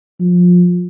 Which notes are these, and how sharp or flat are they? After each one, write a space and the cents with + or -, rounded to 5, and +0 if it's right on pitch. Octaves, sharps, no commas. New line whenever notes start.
F3 +25